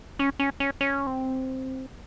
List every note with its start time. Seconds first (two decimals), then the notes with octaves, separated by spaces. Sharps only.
0.19 C#4
0.39 C#4
0.60 C#4
0.81 C#4
1.07 C4